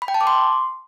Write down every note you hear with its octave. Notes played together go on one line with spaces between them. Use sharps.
B5
G5
A5
D6
C6